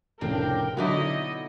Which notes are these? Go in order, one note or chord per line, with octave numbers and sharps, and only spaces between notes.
F1 A2 C#3 C4 D4 A#4 G5
B2 D3 F#3 D#4 E4 D#5